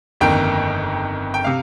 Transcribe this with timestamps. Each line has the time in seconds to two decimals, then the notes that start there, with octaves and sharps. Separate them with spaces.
0.21 G1 F2 D#3 A#3 G5
1.34 G5
1.44 C3 F5